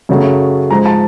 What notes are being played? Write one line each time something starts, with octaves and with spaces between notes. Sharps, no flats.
F#2 C#3 F#3 A3
G#2 F3 G#3 A#5
A5